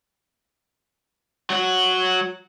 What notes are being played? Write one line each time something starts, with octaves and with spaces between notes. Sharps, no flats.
F#3 F#4